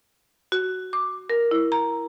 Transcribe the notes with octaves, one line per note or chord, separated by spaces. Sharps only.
F#4
D6
A#4
E4
A#5